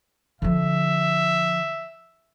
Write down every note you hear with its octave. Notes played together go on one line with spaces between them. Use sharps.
D3 F3 E5